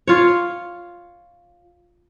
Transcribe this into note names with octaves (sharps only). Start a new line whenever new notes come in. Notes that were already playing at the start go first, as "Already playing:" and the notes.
F4 C#5